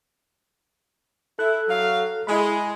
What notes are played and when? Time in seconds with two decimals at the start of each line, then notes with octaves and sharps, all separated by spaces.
1.39 E4 A4 F#6
1.69 F#3 F5
2.27 G#3 E4 B5